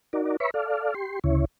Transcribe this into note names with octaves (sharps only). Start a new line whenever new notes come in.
D#4 F#4 A#4 D5
B4 C#5 E5 B5 C#6
A4 D5 F5
G4 C6
D2 C#3 E4 C#5